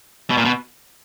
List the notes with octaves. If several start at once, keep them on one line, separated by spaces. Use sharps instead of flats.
B2
A#2
B2